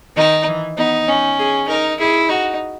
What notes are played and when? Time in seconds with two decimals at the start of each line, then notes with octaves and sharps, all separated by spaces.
0.17 D#3 D#4
0.48 E3
0.78 B3 D#4
1.07 C#4 D#4
1.39 G#4
1.68 D#4 A#4
2.00 E4 G#4
2.29 D#4 F#4